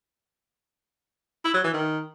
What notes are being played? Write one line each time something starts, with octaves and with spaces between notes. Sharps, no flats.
E4
F#3
E3
D#3